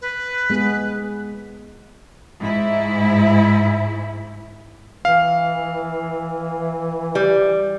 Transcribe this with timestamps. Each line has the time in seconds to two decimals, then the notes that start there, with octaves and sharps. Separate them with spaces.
0.01 B4
0.50 G#3 B3 G#4
2.40 G#2 E4
5.05 E3 F5
7.15 G3